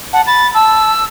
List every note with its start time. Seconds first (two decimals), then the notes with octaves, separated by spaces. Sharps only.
0.13 F#5 A5
0.27 B5 A6
0.54 A5 E6